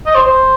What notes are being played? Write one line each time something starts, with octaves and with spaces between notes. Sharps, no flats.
D#5
C5
C5